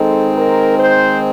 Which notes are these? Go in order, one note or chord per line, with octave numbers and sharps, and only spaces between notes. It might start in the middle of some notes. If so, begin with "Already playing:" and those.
Already playing: D#3 G#3 C4 D#4 A4
A#4
C5